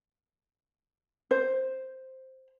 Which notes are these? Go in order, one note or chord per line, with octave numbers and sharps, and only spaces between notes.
C5